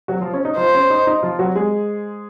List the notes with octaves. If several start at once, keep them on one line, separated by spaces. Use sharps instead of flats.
F#3 F#4
F3 F4
C#4
D#4
F3 F4 C5
C#4
D#4
D#4
F3 F4
F#3 F#4
G#3 G#4